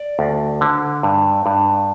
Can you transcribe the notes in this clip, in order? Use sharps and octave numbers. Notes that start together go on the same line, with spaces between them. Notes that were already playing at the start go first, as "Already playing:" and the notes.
Already playing: D5
D2
D3
G2
G2